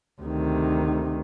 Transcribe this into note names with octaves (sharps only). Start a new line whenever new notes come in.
D2 C3 D#3